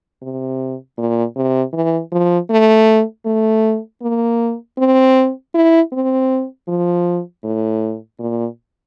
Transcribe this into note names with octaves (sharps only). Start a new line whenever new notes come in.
C3
A#2
C3
E3
F3
A3
A3
A#3
C4
E4
C4
F3
A2
A#2